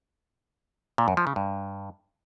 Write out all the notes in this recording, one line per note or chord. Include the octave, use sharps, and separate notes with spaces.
A#2
F#2
F3
C#3
G2